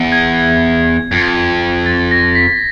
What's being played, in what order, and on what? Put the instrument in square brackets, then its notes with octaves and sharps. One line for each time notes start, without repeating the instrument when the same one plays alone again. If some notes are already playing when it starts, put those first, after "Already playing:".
Already playing: [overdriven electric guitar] E2
[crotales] G#6
[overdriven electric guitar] F2 [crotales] G#6
[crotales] A6
A#6
B6